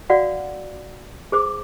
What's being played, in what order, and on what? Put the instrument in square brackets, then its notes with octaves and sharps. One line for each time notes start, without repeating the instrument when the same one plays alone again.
[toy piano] F#4 D5 F5 F#5
G#4 C5 D6